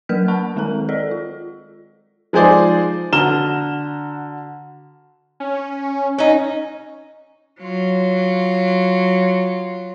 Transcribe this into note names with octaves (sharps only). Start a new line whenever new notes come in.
F#3 A#3 A#4 B4 F6 B6
F#5 A5 B5 C#6 F#6
D#3 G#3 C4 A4 A#4 A#5
G#4 A4 D5 D#5
F4
F3 G#3 D#4 G#4 C5 D5
D3 F#4 A#5 F6 E7 G7
C#4
C#4 D#4
F#3 F4